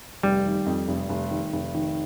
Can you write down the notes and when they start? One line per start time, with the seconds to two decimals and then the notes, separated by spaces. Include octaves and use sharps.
0.23 F1 G3
0.46 D#3
0.66 F2
0.88 F1
1.09 F1
1.31 D#3
1.53 F1
1.74 D#3